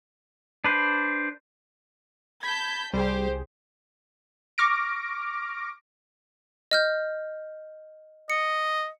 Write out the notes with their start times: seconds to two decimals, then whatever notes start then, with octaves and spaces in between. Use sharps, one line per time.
0.64 D4 B4 C5
2.43 A5 B5 G6 G#6 B6
2.94 C2 G3 G4 G#4 C5
4.58 C#6 D6 F6 A#6 D7
6.71 D#5 F6 G6
8.30 D#5 C#7